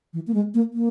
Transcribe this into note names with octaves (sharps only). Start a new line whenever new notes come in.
E3
A#3
G#3
A#3
A#3